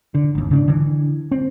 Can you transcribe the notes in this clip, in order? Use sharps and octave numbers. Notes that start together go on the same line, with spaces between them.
D3
G#1 D#2
C#3 C#4 D4
D3 E3
C4